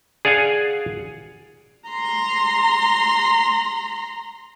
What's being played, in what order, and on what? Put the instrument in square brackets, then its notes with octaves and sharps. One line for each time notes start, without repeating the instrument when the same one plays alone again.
[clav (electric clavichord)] G#4 D5 F5 F#5 G#5
[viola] A#5 C6